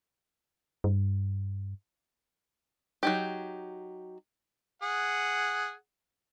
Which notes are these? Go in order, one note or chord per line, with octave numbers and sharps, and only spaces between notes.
G2
F#3 D#4 G4
G#4 F#5